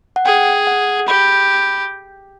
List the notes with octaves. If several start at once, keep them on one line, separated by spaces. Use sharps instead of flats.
F#5
G#4 G5
F#5
G4 B5